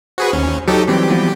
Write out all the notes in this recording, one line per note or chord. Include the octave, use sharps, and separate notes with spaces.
F#4 G#4 B4 C5
D#2 C#4
F#3 D#4 G4 A4
E3 F#3 G3 C4 G4
F3 B3 C4